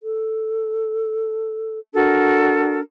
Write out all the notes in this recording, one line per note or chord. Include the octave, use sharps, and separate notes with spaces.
A4
D4 F#4 A4 A#4